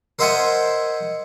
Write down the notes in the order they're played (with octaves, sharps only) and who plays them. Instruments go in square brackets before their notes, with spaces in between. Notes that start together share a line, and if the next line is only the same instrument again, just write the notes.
[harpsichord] A#4 C5 D#5 E5 F#5 G#5